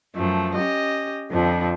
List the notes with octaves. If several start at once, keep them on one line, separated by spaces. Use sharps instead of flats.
F#2 F3 A3
C#4 G4 D#5
F2 D3 F3 C4